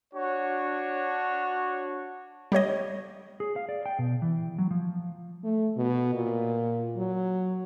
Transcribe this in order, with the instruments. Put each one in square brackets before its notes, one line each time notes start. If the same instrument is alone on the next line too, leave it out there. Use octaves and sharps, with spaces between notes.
[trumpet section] D4 F#4 C#5
[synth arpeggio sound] G3 G4 C#5 D#5
[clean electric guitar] G#4
F5
D5
G5
B2
E3
F#3
F3
[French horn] A3
B2
A#2
F#3